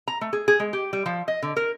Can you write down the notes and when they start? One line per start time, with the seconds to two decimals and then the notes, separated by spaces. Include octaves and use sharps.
0.08 A#5
0.21 A3
0.33 G#4
0.48 G#4
0.60 G#3
0.73 G4
0.93 G3
1.06 F3
1.28 D#5
1.42 D3
1.56 A#4